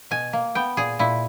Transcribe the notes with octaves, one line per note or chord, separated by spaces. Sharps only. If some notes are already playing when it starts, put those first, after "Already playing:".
B2 G#5
A#3
B3 G5
A#2 G#4
A#2 E4